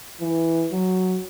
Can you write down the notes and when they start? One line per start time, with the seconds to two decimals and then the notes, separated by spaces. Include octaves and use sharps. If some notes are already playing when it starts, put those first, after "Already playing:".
0.21 E3
0.72 F#3